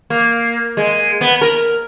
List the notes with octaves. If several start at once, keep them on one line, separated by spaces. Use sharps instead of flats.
A#3
G#3
B3
A#4